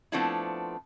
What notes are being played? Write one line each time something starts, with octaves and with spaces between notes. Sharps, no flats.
F3 A3 B3 C4 D4 E4